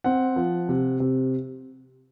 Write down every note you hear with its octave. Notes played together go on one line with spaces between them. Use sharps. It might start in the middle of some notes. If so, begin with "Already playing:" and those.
C4 F#5
F3
C3
C3